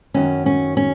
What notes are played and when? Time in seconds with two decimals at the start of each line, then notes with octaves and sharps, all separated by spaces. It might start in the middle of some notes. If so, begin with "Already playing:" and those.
0.14 F#2 D#3 F#3 C#4
0.46 C#4
0.77 C#4